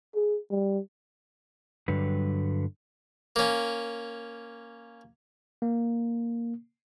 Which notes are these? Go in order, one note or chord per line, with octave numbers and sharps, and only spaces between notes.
G#4
G3
G2 D3 F#3 G3 B4
A#3 C#4
A#3